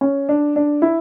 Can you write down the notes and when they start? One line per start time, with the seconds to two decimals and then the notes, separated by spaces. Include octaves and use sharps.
0.01 C#4
0.29 D4
0.56 D4
0.82 E4